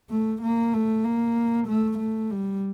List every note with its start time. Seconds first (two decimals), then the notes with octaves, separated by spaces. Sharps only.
0.10 A3
0.42 A#3
0.73 A3
1.04 A#3
1.68 A3
1.99 A3
2.30 G3